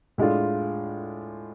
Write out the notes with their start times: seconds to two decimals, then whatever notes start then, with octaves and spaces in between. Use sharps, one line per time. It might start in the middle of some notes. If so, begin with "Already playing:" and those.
0.18 A2 G#3 D4 F4